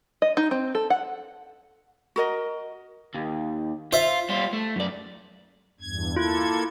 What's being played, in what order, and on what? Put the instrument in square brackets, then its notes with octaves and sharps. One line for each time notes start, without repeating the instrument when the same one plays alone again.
[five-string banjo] D#5
D#4
C4
A4
F#5
[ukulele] F#4 A#4 D#5
[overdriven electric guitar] D#2
[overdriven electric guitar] F4 [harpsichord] C5 E5
[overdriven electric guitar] G3 F4
A3
F#2 D5
[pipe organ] E2 G2 G#6
[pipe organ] A#3 A4 G#6 [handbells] E4 F4